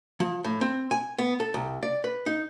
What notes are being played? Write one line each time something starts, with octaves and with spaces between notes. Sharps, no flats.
F3
A2
C4
G#5
B3
A4
C2
D5
B4
D#4